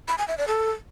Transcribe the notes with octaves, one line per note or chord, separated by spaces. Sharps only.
B5
G#5
E5
D5
A4